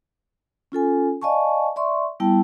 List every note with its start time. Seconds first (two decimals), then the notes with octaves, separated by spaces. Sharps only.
0.72 C#4 F4 A4 G#5
1.22 D5 D#5 F5 G#5 A5 C#6
1.76 D5 E5 C6 C#6
2.20 G3 B3 E4 G5 A5